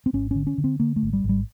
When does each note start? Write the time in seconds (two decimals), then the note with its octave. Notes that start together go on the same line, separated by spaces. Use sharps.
0.06 C4
0.13 G#1 C#4
0.31 D3 C#4
0.47 C#4
0.58 D3
0.64 C4
0.80 D3 A#3
0.96 A3
1.03 G#1
1.13 G3
1.24 G#1
1.29 G3